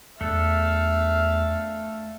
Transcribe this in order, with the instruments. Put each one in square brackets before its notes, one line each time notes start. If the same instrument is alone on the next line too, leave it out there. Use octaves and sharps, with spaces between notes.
[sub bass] E2 [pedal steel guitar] A3 D4 A4 [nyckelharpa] E5 F5